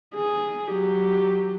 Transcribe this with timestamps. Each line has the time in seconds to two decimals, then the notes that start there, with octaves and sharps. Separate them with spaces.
0.15 G#4
0.71 F#3 G4